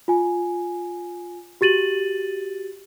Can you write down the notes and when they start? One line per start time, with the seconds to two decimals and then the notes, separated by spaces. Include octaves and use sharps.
0.08 F4 G#5
1.61 F#4 G4 A6 D#7 F#7